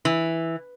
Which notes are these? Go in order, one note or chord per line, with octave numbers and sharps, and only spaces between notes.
E3